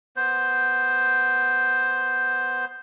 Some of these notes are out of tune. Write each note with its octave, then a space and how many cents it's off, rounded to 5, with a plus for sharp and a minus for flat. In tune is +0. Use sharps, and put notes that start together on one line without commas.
B3 +0 C5 +0